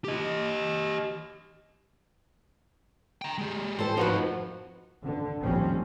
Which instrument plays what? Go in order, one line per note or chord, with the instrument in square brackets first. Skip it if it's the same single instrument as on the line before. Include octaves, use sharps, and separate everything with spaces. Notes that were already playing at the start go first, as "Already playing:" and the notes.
[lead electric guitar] G4 D#5
G5 A#5
G#3 G4
[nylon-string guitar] E3 G3 A4 [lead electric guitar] C5
[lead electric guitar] F2 D#4 [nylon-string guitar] F3 F#4 B4
[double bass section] D3
A#1 D#2 F3 G3 C4 C#4